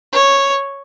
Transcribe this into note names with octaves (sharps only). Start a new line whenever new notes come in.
C#5